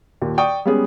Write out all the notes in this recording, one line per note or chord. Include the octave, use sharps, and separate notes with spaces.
D#2 A#2
D5 G5 C#6 D#6
G3 G#3 B3 C#4 G#4